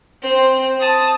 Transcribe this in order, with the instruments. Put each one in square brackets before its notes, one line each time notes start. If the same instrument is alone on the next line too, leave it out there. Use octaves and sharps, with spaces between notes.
[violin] C4 C5
A5 D#6